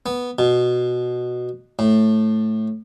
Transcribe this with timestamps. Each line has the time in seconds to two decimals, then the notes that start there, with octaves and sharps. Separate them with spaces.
0.06 B3
0.39 B2
1.79 A2